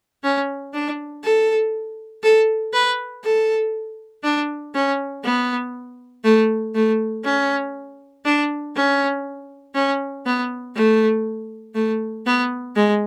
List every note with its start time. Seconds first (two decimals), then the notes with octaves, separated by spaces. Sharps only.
0.23 C#4
0.74 D4
1.24 A4
2.23 A4
2.73 B4
3.24 A4
4.24 D4
4.75 C#4
5.24 B3
6.24 A3
6.75 A3
7.24 C#4
8.25 D4
8.75 C#4
9.75 C#4
10.26 B3
10.75 A3
11.75 A3
12.26 B3
12.76 G#3